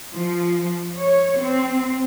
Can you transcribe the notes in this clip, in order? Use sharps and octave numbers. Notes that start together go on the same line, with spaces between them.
F3
C#5
C4